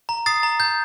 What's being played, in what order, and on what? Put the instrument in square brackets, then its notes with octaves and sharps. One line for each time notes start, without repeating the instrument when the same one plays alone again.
[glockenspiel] A#5
D#6 A6 C7
A#5
G6